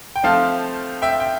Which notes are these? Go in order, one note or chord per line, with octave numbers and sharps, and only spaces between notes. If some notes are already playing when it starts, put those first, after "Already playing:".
G5
F3 A3 C4 F5 A5
E5 G5
G5